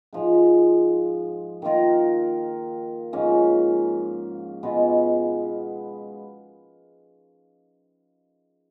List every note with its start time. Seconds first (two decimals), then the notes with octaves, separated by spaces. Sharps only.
0.13 G#2 F3 G#3
1.62 D#3 A#3 F4 A#4
3.13 G#2 F3 A#3 C#4
4.63 B2 G#3 B3 F4